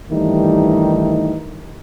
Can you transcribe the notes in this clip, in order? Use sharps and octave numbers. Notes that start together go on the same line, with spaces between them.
G2 D#3 E3 G3 A3 D#4